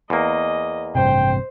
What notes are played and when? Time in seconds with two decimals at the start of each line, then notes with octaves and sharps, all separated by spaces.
0.10 E2 A#3 D#5
0.95 A1 G2 C3 C5 G5